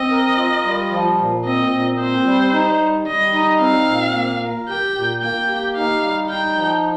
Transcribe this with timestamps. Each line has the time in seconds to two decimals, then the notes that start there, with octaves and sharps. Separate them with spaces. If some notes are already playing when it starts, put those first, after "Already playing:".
Already playing: C4 D#5
0.11 A#4
0.38 F4
0.65 G3
0.91 F3
1.19 A#2
1.45 C4 D#5
1.73 A#2
1.99 C4 C5
2.26 G3
2.53 D#4
2.81 G3
3.07 G3 D#5
3.33 D#4
3.60 C4 F5
3.87 A#2
4.15 A#3
4.42 A#4
4.69 G4 G5
4.96 A#2
5.22 A#3 G5
5.49 G4
5.76 D#4 F5
6.04 G3
6.30 D#4 G5
6.57 F3